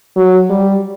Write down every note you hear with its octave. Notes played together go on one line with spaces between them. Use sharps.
F#3
G3